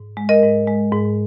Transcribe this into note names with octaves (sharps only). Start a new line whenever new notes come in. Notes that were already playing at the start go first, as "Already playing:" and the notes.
Already playing: G#2
G#3
A#4 D#5
G#2
G#3
G#2